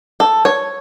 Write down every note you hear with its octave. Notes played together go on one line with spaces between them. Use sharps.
A4
C#5